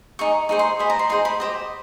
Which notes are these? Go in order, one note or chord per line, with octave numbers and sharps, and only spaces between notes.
D#4 G#4 C#6
D#4 G#4 C5 C#6
C6
D#4 G#4 C5 B5
A#5
C6
D#4 G#4 C5 C6
B5
G4 C5 D#5